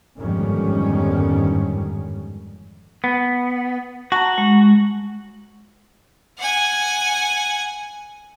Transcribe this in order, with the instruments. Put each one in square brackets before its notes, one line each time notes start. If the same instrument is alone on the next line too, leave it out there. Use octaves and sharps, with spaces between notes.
[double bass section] G1 F2 G#2 D#3 G3 C#4
[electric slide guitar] B3
[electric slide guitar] F#4 [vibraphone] A5 A#5
[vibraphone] G#3
[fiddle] F#5 G#5